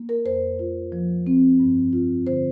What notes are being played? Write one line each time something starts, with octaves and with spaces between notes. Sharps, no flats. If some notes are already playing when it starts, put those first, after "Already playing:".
Already playing: A#3
A#4
F2 C5
F4
F3
C4
G2
F4
D3 C5